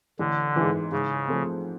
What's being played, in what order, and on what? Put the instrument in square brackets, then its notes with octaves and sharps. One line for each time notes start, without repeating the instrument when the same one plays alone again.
[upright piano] A1 [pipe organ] D3
[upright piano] G#2 E3
[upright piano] G#2 [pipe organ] C#3
[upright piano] F3 A3 C4